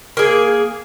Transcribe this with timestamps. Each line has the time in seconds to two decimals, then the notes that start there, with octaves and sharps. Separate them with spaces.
0.17 A#3 G#4